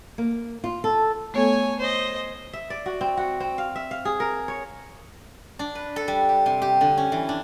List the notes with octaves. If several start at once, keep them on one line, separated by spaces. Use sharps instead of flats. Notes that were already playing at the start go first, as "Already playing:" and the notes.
A#3
F4
A4
A3 B3 A4 C#5 G#5
C5 D#5
E5
D5
F#4
C4
F#4
C4
F5
E5
F5
G#4
A#4
C#5
D4
B4
A4
G3
G4
C3
G4
D3
C#4
E3
D4